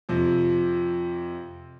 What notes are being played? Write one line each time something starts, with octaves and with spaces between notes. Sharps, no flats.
F2 C3 F3